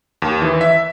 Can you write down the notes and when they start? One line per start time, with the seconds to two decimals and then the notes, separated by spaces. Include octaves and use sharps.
0.22 D#2
0.42 E3
0.61 E5